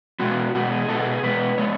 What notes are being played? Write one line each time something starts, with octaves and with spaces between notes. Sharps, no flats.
B2 G#3 B3 F#4
B2 G#3 B3 F#4
G#4
B2 G#3 B3 A4
G#4
G#4
B2 G#3 B3 B4
G#3 B3 C#5